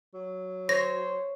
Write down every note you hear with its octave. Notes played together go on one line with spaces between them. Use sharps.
F#3
C5 C#5 A#6